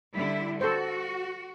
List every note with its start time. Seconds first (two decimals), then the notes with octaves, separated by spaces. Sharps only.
0.13 D3 G3 E4
0.61 F#4 A4 C5